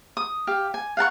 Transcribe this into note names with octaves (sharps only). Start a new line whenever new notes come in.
D#6
G4 F5
G#5
F5 F#5 A5 C#6